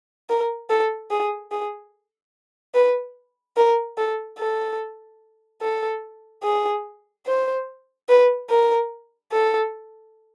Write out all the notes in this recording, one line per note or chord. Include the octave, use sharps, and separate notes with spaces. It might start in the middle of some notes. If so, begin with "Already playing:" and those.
A#4
A4
G#4
G#4
B4
A#4
A4
A4
A4
G#4
C5
B4
A#4
A4